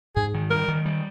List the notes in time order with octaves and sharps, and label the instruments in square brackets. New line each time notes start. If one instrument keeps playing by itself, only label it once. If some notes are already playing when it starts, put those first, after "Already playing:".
[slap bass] G#2 [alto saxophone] G#4
[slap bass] D#3
[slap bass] G3 [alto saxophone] A#4
[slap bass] D#3
G3